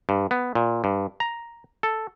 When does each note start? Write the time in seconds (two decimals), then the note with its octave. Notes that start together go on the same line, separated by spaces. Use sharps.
0.09 G2
0.31 B3
0.55 A#2
0.84 G2
1.20 A#5
1.83 A4